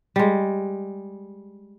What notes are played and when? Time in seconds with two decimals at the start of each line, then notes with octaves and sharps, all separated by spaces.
0.16 G3 G#3